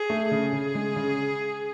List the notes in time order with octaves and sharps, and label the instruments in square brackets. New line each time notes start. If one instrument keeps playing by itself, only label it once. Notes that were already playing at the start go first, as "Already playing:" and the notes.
Already playing: [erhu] G#4
[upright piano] A3
[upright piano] C#3 [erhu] G#4
[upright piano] C#3
G#3
C#3